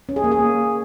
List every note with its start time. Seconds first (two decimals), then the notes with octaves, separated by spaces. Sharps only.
0.09 C#4
0.16 G#4
0.24 A#3
0.31 G#4
0.39 A#3